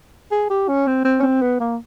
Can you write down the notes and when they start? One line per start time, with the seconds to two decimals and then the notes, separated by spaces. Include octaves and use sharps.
0.32 G#4
0.50 G4
0.69 C#4
0.87 C4
1.05 C4
1.20 C#4
1.23 C4
1.42 B3
1.60 A#3